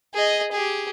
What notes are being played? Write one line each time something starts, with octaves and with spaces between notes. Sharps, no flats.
G#4 D#5
G4 G#4